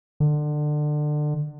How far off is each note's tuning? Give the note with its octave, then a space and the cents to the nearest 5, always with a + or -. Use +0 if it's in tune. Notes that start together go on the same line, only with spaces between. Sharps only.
D3 +25